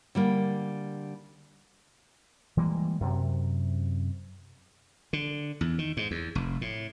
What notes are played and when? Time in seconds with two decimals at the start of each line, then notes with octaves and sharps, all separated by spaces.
0.15 D3 G3 A#3
2.57 E3 G3 G#3 A#3
3.01 F#2 C3
5.13 D3
5.61 E2
5.79 D#3
5.97 G#2
6.11 E2
6.35 F1
6.61 A2